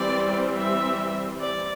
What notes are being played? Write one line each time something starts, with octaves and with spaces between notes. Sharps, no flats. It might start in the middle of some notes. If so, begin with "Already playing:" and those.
Already playing: E3 G3 C4 D5
E5
D5